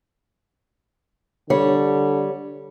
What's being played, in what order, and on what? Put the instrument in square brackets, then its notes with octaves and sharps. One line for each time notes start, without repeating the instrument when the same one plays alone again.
[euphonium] D3 [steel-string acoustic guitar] G3 C#5